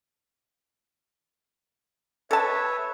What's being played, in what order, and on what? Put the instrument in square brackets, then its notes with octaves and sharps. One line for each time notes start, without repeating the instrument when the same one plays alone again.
[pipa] A4 A5 [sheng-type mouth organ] B4 C#5 E5